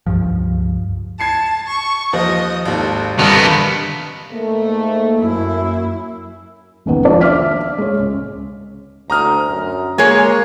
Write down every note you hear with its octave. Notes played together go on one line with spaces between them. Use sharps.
C#2 G2 F3
A5 G#6 C7 C#7
C#6
D#2 F3 D#5
G#1 D#2 A4
C2 G2 D3 D#3 B3 A5
G#2 A3 A#3
F#2 E4
F1 C#2 D#3 B3
F3 D4 F4 D5
E5 D6 F6 B6
G#3 C#5
C#2
D2 A#5 D#6 F6
F#2
G#3 A#3 G#4 C#5